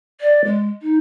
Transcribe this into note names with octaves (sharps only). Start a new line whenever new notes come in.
D5
G#3
D#4